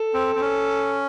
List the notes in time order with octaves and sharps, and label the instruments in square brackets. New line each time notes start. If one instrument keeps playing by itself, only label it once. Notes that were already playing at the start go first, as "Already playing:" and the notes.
Already playing: [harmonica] A4
[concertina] C4
C4
C#4